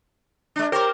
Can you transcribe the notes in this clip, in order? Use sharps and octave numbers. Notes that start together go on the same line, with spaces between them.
G#3 D4
G4 A#4 C5 C#5